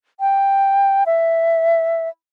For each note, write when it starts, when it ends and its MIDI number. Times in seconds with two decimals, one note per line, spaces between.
0.20 1.04 79
1.06 2.09 76